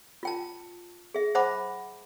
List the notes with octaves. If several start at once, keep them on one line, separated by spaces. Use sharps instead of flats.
F4 G5 A5
G#4 E5
C5 E5 F#5 A5 B5 D6